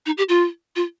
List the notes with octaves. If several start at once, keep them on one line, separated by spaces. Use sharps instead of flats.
D#4
G4
F4
F4